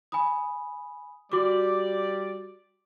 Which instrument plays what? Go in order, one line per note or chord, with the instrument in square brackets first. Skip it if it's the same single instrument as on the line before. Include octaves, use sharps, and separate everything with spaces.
[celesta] G#5 B5 D#6
[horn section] G3 D5 [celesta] F#4 D6